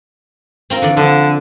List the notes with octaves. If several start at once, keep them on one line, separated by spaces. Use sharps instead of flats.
C4 F4 A#4
D3 E3 D5
D3 F3